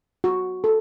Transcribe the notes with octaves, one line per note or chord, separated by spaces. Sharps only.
F#4
A4